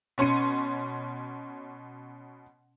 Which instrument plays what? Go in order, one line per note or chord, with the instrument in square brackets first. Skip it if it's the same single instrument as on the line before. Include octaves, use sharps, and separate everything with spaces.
[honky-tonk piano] B2 C#4 C6 C#7 D#7